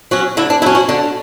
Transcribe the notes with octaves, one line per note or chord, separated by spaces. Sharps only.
F#3 C#4 F#4
D3 E4
D4
F#3 C#4 E4
F#4
D3 D4